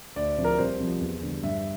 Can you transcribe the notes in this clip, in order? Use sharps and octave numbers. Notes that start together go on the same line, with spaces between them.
D2 D5
C3 F3
A#4
C2 C5
C3 F3
E2
D3 G3
G2 E5